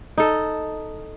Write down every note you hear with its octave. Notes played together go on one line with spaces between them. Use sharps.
D#4 A4